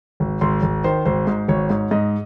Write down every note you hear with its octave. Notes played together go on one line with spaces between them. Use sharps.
G#1
G#1 C6
G#1
D#3 C5
G#1 C5
G#2
G#1 C#5
G#2
G#2 D#5